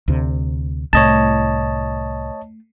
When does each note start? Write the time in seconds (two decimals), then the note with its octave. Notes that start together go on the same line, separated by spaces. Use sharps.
0.08 D2 C3
0.93 C2 A2 A3 C#5 D#5 A5